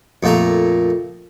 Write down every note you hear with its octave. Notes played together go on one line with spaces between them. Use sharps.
F2 A#2 A3 A#5